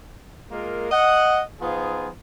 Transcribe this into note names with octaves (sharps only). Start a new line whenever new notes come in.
G#3 A#3 F4 A#4
D#5 F#5
F3 B3 D#4 F4 G#4